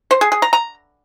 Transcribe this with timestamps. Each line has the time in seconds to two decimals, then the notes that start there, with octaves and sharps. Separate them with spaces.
0.11 C5
0.21 G#4
0.32 G#4
0.42 A#5
0.53 A#5